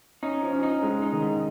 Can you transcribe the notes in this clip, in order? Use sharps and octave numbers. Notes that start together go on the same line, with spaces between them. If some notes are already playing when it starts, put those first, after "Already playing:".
C#4 D#4
F3
C#4
D#4
G#2 G#3
D#4
D#3
G#2